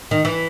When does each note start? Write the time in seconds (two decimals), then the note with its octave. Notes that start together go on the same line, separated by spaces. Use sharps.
0.11 D#3
0.25 E3